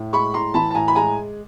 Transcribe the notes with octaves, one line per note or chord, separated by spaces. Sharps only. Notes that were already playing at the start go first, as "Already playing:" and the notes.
Already playing: A2
G#3 B5 C#6
A2 A#5 C6
E3 A5 B5
A5
A2 G#5 A#5
B5
G#3 G#5 A#5